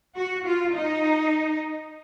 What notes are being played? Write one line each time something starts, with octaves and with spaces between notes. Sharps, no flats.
F#4
F4
D#4